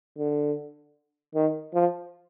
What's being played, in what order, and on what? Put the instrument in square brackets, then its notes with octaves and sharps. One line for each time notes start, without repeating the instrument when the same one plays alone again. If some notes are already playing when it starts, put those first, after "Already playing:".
[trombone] D3
D#3
F3